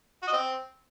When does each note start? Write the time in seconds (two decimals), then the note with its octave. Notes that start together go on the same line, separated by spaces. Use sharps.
0.23 F#4
0.28 D#5
0.33 C4